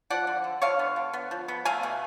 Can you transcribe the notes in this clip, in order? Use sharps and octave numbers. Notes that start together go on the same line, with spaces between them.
F3 D5 F#5
D3
D3
D3 C#5 F5
B3
D3
B3
F3
B3
A3 F5 G#5
B2